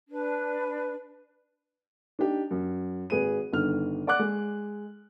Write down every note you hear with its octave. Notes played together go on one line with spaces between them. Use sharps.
D4 B4
D4 D#4 G4
F#2
G#1 G#4 B4 D#7
G1 D3 D#3 F6
D5 F#5 D6 F#6
G#3